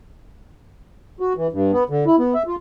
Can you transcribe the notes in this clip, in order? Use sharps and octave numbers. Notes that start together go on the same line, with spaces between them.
F#4
E3
G2
B3
D3
E4
B3
E5
F4